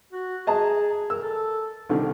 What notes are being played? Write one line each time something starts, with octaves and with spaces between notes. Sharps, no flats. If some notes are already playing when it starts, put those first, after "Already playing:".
F#4
G#4 D#5 A5 A#5
A#4 E6
A4
C2 D3 D#3